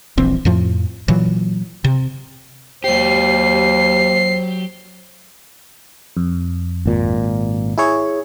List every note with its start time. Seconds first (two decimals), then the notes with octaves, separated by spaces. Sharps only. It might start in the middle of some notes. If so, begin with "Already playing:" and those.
0.18 D#1 A#1 E3 C4
0.45 F2 A2 F3
1.08 A#2 E3 F#3
1.84 C3
2.84 D#2 F#3 G4 C5 C7
6.17 F2
6.86 G#1 A#2
7.78 E4 G#4 C#5